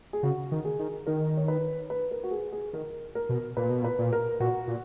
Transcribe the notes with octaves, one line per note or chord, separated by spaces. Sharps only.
G#4
C#3 F#4
D#3
G#4
D#3
D#3 A#4
C#5
B4
B4
A#4
F#4
G#4
G#4
D#3 A#4
A#4
B2
A#2 B4
B2
A#2 B4
A#2
A#4
A#2 F#4
A#2